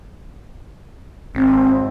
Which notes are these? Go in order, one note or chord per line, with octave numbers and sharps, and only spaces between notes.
G#1 C4